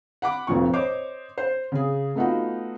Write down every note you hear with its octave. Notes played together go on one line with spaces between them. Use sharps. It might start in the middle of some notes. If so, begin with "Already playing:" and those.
F#5 B5 D6
F1 F2 A#2 C#6
C5 C#5 D#5 D6
C5
C#3 G#4
A3 B3 D#4 F4 F#4